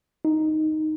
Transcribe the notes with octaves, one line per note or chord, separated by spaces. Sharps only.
D#4